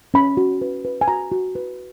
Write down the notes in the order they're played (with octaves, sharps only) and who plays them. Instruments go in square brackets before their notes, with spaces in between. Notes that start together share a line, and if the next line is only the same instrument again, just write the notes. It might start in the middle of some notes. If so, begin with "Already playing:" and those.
[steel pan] C#4 B5
F#4
B4
B4
G#5
F#4 A#5
F#4
B4